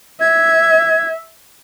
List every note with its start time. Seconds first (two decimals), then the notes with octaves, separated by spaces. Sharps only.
0.21 E5 G#6